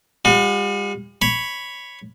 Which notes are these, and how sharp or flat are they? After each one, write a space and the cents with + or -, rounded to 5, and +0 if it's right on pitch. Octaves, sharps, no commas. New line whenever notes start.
G3 +45 F#4 -35
C#5 +0 B5 +0